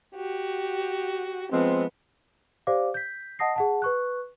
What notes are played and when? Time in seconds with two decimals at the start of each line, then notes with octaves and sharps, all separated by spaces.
0.14 F#4 G4
1.52 F3 G#3 B3 C4
2.67 G4 C5 D5 F5 D6
2.94 G6 B6
3.39 D#5 F#5 A5 D#6 A#6 C7
3.56 G#4 F#5 A5
3.82 B4 C#6 F#6